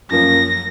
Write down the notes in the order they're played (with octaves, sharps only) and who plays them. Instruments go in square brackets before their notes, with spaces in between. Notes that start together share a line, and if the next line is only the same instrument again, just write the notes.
[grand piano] F#2 F3 A#3 C#4 [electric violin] A#6